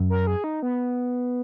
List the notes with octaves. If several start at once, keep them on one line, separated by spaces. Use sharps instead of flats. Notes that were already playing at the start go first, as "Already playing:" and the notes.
Already playing: F#2
A#4
G#4
D#4
B3